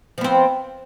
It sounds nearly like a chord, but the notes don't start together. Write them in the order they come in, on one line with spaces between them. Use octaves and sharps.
F3 B3 C4